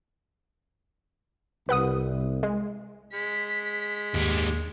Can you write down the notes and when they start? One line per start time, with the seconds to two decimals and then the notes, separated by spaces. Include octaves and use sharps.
1.69 C2 B4 F#5 D#6
2.43 G#3
3.14 G#3 B6
4.14 D#2 G#2 G3